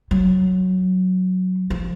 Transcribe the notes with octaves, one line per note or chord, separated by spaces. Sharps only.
F#3
F3